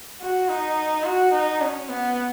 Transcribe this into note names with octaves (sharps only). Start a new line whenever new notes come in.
F#4
D#4
F#4
D#4
C#4
B3